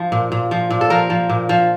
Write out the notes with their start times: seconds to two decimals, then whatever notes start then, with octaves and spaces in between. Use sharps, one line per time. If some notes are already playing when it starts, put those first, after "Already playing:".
Already playing: F3
0.12 A#2
0.32 A#2
0.51 F3
0.70 A#2
0.81 A4
0.90 F3 A#4
1.10 F3
1.29 A#2
1.49 F3